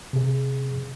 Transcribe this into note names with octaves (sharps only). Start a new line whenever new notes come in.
C3 G#4